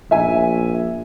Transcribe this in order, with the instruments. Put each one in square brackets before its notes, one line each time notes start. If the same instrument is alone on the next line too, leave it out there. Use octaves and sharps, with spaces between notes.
[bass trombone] A#1 [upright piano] E5 G#5